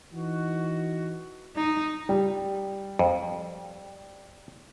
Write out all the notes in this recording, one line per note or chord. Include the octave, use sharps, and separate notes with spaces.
E3 D#4 F#4
D#4
G3
F2